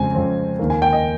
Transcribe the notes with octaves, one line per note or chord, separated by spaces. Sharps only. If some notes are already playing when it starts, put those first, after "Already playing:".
Already playing: F2 C#3 G#3 C4 G#5
F2 C#3 G#3 C4
D#2 D#3 A#3
G#5
G5
D#5